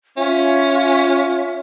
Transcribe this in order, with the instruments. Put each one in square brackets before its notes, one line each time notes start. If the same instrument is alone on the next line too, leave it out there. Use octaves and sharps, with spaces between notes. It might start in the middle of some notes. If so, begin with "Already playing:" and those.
[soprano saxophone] C#4 [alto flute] F4 [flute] E5